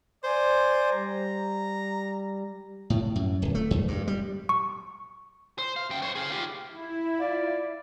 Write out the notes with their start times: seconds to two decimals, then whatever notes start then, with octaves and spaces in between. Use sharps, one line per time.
0.24 C5 D5 G#5
0.92 G3 A#5
2.90 A2
3.16 F#2
3.42 D1
3.55 A3
3.71 E2
3.88 G2
4.08 G3
4.49 C#6
5.58 C5
5.76 F5
5.90 F#2 G5
6.02 C5 C#5
6.15 G#4 F5
6.31 F4 G4
6.70 E4
7.19 F4 D5 F5